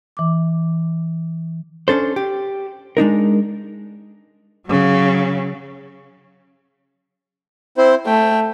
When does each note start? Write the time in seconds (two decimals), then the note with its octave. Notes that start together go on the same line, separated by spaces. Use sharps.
0.17 E3 D6
1.88 C#4 D4 A4 C5
2.16 G4
2.97 G#3 D4 D#4 A#4
4.67 C#3 F#3
7.77 C4 E4 C5
8.06 A3 G5